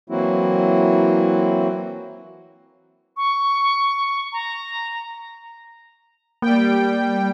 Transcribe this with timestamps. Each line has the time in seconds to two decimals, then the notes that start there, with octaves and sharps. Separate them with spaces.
0.10 E3 F#3 A#3 C4 E4 F#4
3.17 C#6
4.33 A#5
6.42 G3 A#3 G5